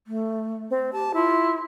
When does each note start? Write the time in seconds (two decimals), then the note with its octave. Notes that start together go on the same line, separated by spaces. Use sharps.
0.07 A3
0.70 C4
0.93 G4 A5
1.14 E4 F4